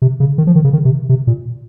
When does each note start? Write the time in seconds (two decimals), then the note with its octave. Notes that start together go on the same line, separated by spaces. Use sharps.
0.02 C3
0.20 C#3
0.38 D#3
0.47 F3
0.55 D#3
0.64 C#3
0.73 D#3
0.85 C3
1.09 C3
1.27 A#2